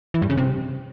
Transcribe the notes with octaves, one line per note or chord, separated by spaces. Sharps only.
E3
G2
C#3
C3